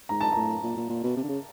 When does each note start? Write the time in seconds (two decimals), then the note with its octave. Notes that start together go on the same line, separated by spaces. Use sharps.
0.09 G#2 A#5
0.21 A5
0.32 A2 A#5
0.63 A#2
0.77 A#2
0.89 A#2
1.03 B2
1.17 C3
1.23 D3
1.29 C#3